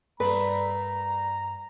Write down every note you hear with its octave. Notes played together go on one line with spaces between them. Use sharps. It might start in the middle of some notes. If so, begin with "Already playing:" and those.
G2 A3 A#3 B4 D5 A#5